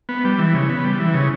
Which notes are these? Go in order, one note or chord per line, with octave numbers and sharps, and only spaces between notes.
B3
G3
E3
C#3
B3
G3
E3
C#3